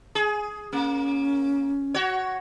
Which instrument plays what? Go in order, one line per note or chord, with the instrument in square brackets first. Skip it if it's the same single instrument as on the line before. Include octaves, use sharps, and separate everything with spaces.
[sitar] G#4
[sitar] A#3 [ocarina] C#4
[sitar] F#4 C#5